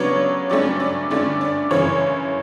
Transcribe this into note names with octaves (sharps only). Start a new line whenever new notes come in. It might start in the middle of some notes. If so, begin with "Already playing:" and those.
Already playing: C#3 F#3 B3 D4 C#5
G2 F#3 A3 C#4 D5
D5
G2 D3 A3 C#4 D5
D5
F#2 C#3 E3 C#5